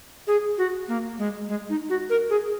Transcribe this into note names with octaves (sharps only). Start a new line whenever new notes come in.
G#4
F#4
A#3
G#3
G#3
D#4
F#4
A#4
G#4